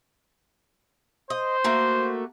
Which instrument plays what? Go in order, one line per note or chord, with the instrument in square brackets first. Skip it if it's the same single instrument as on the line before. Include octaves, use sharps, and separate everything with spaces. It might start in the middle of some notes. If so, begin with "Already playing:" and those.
[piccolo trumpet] C5 [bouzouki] D#5
[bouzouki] A3 A#3 F#4